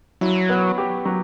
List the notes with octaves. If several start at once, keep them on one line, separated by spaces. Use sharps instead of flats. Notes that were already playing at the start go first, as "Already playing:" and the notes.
F#3 E4
B3
G4
F#3